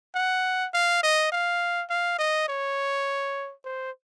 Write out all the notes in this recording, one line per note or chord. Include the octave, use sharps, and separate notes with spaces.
F#5
F5
D#5
F5
F5
D#5
C#5
C5